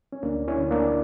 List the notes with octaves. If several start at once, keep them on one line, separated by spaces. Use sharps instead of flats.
C#4
D2 A#3 D4
C#4 E4
D2
A#3 D4